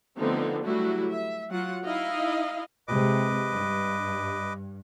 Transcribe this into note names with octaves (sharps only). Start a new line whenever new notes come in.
D3 F3 A3 B3 C4 D#4
F#3 G3 A3 E4 F#4
E5
F#3 F4 F#5
D#4 E4 D#5 F5
C3 G#3 B4 D#5 D6
G2